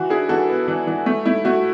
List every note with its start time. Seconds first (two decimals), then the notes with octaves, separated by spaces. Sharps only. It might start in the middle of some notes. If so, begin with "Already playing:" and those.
Already playing: E3 F#4
0.10 D4 E4 G#4
0.29 E3 F#4 A4
0.49 B3
0.68 E3
0.87 E3
1.06 A3
1.26 A3 E4
1.45 A3 F#4